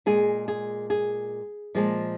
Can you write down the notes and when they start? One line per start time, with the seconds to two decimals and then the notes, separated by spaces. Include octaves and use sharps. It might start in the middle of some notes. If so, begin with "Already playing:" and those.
0.06 A#2 G#3 G#4
0.48 G#4
0.90 G#4
1.75 A#2 F3 G#3